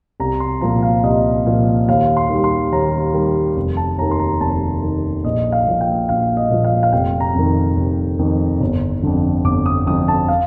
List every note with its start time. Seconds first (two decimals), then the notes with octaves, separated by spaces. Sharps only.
0.20 C2 A#5
0.40 C6
0.61 A#2 F3 A#5
0.83 F5
1.04 C2 D#5
1.46 A#2 F3
1.88 D#2 F5
2.17 C6
2.30 D#3 G3
2.44 C6
2.72 D#2 A#5
3.14 D#3 G3
3.57 F1
3.77 A5
3.98 D#2 D#3 A#5
4.11 C6
4.20 A#5
4.40 F1 A5
4.83 D#2 D#3
5.24 A#1 D#5
5.52 F5
5.67 A#2 F3
5.81 G5
6.09 A#1 F5
6.37 D#5
6.50 A#2 F3
6.64 F5
6.83 F5
6.93 F1 G5
7.20 A#5
7.34 F2 D#3
7.77 F1
8.19 F2 D#3
8.61 G1
9.03 F2 D3
9.44 G1 D6
9.66 D#6
9.86 F2 D3 D#6
10.08 A5
10.28 F5